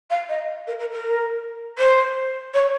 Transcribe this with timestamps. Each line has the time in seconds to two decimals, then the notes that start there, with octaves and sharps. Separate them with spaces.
0.10 F5
0.28 D#5
0.67 A#4
0.79 A#4
0.92 A#4
1.78 C5
2.54 C#5